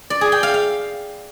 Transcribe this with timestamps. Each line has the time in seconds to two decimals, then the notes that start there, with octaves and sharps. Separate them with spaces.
0.10 D5
0.21 G#4
0.32 G5
0.43 F5
0.54 F5